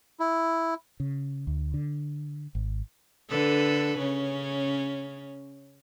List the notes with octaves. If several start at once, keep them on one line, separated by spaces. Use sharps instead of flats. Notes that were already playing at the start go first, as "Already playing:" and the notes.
E4
C#3
D2
D3
G#1
D3 A4 B4
C#3 C#4